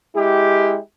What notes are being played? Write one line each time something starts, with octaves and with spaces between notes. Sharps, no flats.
G#3 E4 G4